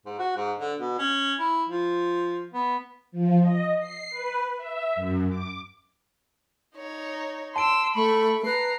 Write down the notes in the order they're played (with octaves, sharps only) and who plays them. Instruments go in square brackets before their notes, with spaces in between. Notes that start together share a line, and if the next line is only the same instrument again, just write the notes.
[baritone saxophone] G#2
F#4
G#2
D3
B2
C#4
E4
F3
B3
[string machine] F3
D#5
C7
B4
E5
F#2
D6
[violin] D#4 C#5
[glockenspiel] A5 D7 [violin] C6 E6
[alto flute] A3 [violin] B5 C#6
[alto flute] B4 [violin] A#5 C7